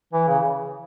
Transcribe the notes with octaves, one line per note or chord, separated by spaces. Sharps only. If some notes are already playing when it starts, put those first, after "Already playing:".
E3
C#3